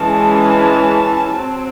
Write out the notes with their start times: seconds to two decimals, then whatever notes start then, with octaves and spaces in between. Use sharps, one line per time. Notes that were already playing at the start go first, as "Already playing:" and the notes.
Already playing: E3 G#3 C#4 A5
1.31 F#3 C4